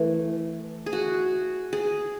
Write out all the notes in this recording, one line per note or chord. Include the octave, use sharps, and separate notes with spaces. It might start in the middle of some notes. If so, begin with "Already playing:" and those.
Already playing: E3 A3
G#4
F#4
G#4